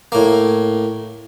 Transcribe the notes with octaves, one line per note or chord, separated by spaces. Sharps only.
A2 A#3